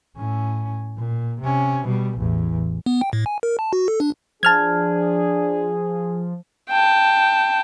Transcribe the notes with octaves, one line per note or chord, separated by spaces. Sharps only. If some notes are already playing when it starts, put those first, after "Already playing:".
A2 C#4
A#2
C3 C#4
B2 G3
A1 E2
B3
G5
A2
G#5
A#4
A5
F#4
A4
D4
F3 D4 G#4 A5 F6 G#6
G5 A5